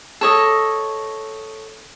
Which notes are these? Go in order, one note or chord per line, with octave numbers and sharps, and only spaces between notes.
A4 C#5 D#5